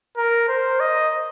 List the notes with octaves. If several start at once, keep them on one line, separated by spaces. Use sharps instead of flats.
A#4
C5
D#5